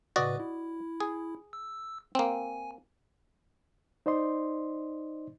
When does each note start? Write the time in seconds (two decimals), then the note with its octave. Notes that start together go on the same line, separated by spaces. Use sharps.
0.16 A2 C#3 F#4 B4 D5 D#5
0.40 E4
1.00 G#4
1.53 E6
2.15 A#3 C4 G#5
4.06 D#4 C5 D5 D#5 C6